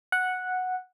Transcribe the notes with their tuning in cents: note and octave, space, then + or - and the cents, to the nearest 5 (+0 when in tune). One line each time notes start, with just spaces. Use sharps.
F#5 -5